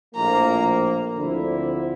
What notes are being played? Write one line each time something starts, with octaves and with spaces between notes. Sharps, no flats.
A#1 A2 F3 A#3 A#5
D2 D3 F3 C4 E4